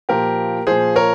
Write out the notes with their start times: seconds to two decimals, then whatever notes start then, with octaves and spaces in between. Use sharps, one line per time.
0.09 A#2 F3 G4 A#4
0.67 A#2 F3 G#4 C5
0.96 A#4 C#5